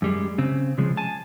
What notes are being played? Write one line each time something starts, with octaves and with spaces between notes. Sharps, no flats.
F#2 G3 G#3
C#3 C4
C#3 F3 G#3
G#5 A5